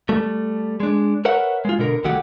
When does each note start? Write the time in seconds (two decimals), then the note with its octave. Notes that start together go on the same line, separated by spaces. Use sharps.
0.09 G3 A3
0.80 G#3 D4
1.25 A#4 B4 C#5 E5 F#5
1.65 G#3 F4
1.79 B2 D3 A#4
2.04 C2 D#3 F#3 A3 G4 F#5